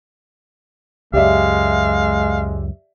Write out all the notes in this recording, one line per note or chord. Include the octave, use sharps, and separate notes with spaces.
C#2 F#2 G#3 G4 D5 E5 F5